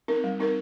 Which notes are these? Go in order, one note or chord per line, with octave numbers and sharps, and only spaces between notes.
C4 D#4 A#4
G3
C4 D#4 A#4